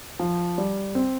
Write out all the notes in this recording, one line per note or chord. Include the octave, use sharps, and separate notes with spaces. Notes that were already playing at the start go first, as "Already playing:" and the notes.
F3
G3
C4